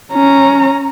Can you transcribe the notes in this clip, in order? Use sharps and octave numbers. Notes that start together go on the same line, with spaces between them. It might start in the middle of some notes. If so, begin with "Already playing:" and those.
C#4 A#5